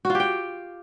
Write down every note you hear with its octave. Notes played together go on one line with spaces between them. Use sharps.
F#4
F4
G4
G5